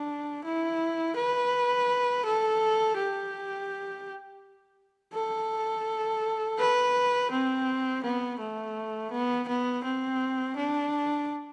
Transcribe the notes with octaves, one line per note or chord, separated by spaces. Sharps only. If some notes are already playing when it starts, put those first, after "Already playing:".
Already playing: D4
E4
B4
A4
G4
A4
B4
C4
B3
A3
B3
B3
C4
D4